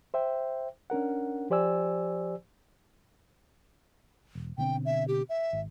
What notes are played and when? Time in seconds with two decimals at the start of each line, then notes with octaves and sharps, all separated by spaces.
0.14 C5 E5 G5
0.90 C#4 D4 A#4 F#5
1.50 F3 G4 C5 D5 G#5 E6
4.35 E1
4.58 B2 D3 C4 G5
4.85 E5
5.08 G4
5.29 E5
5.53 G#1